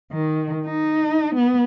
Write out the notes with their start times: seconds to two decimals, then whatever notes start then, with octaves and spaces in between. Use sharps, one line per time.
0.12 D#3
0.66 D#4
1.35 B3